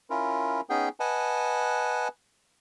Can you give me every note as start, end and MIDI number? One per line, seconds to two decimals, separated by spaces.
0.10 0.61 61
0.10 0.61 64
0.10 0.61 65
0.10 0.61 70
0.70 0.89 59
0.70 0.89 61
0.70 0.89 63
0.70 0.89 68
0.70 0.89 79
1.00 2.08 71
1.00 2.08 75
1.00 2.08 78
1.00 2.08 80
1.00 2.08 81